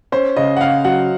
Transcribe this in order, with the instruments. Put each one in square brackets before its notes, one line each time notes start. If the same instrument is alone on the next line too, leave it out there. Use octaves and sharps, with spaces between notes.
[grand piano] C#4 [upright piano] C5
[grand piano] C#3 [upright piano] D#5
[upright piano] F#5
[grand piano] C#3 [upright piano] F5
[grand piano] F#3 [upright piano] F#5